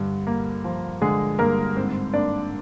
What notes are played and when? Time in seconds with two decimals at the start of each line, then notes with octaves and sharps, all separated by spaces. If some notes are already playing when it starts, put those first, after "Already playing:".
Already playing: G2 D3
0.27 A#3
0.64 F3
1.01 D3 G#3 G#4
1.39 G2 A#3 A#4
1.76 G#2 C4 C5
2.14 A#3 D4 D5